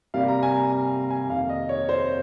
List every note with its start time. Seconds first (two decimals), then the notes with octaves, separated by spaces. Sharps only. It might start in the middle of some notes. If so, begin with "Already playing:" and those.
0.14 C3 G3 A#3 F5
0.28 A#5
0.43 G#5
0.57 A#5
0.72 G#5
0.91 A#5
1.10 G#5
1.30 F2 C3 D#3 A#3 F5
1.49 D#5
1.69 C#5
1.89 C5